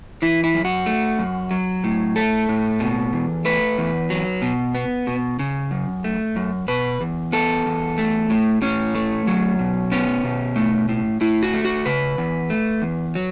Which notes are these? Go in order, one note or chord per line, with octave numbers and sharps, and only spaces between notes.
E3 E4
E4
F#2
F#4
A3
F#2
F#3
A2
A3 A4
A2
B2
E2
A3 B4
E2
F#3
B2
B3
B2
C#3
F#2
A3
F#2
B2 B4
E2
B3 A4
E2
A3
A2
A2 C#4
A3
F#3
B2
B3 C#4
B2
A3
A2
A2 E4
F#4
A3
F#4
C#3 B4
E2
A3
E2
F#3